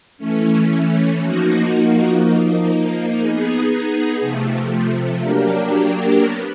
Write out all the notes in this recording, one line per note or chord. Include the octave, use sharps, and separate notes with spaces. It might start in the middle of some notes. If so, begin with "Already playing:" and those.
E3 A3 C#4
F3 A#3 D#4 F#4
F3 A#3 D#4
B3 D#4 G#4
C3 F3 A3
F#3 A#3 D4 G4 A#4
B3